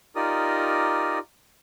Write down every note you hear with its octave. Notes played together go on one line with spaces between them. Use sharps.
D#4 F4 G4 A#4 D5 D#6